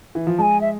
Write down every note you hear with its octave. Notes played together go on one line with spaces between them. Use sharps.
E3
F3
G#3 G#5 A5
E5